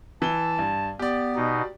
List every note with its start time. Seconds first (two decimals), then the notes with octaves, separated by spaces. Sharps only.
0.22 E3 A5 G7
0.59 G2
0.99 B3 G4 D5
1.36 B2 D#4